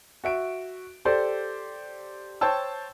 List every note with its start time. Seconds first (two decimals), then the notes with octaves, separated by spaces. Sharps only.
0.24 F#4 E5 D7
1.05 G4 A4 C5 D5
2.41 C5 C#5 G5 A5 E6